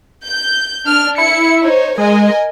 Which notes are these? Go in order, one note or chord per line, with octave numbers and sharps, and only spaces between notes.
G6
D4 F6
E4 C#7
D#4 C5 C#5
G#3 A#4 D#5 G#5